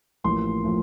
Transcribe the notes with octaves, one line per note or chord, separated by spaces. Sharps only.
A1 A2 F3 A#3 C6
A2 F3 A#3